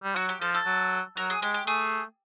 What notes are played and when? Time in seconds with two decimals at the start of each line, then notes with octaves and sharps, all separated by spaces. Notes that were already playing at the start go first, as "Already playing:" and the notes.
0.04 G3
0.16 F#3 F#4
0.29 G4
0.41 F3 A4
0.54 A4
0.66 F#3
1.17 F#3 A#4
1.30 G#4
1.42 G#3 G4
1.54 G4
1.67 A3 G#4